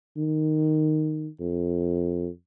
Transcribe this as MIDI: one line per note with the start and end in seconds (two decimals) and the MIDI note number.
0.17 1.27 51
1.40 2.28 41